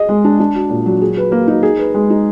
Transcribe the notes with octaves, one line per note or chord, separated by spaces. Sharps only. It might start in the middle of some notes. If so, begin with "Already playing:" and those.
Already playing: G#4 D#5
G#3
D4
D4
F#4
A#2
F#3
G#4
B4
A#3
D#4
G#4
B4
G#3
D#4